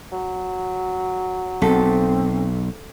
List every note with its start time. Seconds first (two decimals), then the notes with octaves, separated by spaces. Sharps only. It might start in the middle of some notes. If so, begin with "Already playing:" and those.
0.12 F#3
1.62 B1 C4 A4